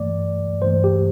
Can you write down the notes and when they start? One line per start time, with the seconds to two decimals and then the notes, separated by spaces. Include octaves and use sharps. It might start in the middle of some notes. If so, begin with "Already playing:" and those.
Already playing: G2 E3 A3 D5
0.61 G2 E3 A3 C5
0.84 G4